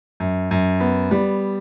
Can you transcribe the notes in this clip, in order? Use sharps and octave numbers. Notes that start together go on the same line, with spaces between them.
F#2
F#2
B3
G3